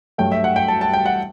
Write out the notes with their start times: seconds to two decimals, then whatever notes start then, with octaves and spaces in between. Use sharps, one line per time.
0.18 G2 F#3 A3 G5
0.32 E5
0.44 F#5
0.56 G5
0.68 A5
0.81 A5
0.93 G5
1.06 F#5